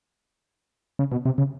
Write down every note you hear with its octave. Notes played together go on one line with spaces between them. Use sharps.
C#3
B2
C3
C#3